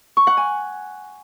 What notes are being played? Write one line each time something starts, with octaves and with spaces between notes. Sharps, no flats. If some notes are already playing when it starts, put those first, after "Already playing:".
C#6
F#5
G#5